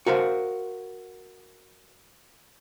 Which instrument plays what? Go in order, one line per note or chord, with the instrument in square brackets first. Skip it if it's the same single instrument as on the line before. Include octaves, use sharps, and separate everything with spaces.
[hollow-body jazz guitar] F#4 A#4 C5 F5